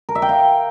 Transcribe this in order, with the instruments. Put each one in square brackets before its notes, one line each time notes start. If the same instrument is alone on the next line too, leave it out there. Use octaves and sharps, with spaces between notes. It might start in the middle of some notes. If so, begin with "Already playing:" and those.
[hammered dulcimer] A#4
E5
G5
F5